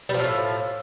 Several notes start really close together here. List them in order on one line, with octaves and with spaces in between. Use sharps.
G3 F3 C3 A2